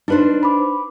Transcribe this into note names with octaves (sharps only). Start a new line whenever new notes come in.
D4 D#4 B4 C5
B5 D6